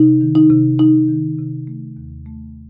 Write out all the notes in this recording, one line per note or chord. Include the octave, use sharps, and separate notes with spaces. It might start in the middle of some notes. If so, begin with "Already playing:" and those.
Already playing: C3 D#4
D#3
D#4
C3
C3 D#4
D#3
C3
A3
D#2
A3